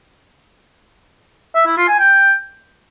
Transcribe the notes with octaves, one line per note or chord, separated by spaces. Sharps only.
E5
E4
F4
G#5
G5